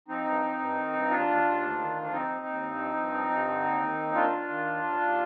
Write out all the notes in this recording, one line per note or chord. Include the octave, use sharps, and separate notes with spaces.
F3 C4 D#4
G2
F3
G2
D#3
G2
D#2 D4 F4
D#2
D#2
D2
D#3
D2
D4
F3 C4 D#4
D#2
D#2
G2
F3
G2
F3
G2
D3
D#2
D#3
D#2
D#3 D4 F4
D#3
D#3
D#2
D#2
D#2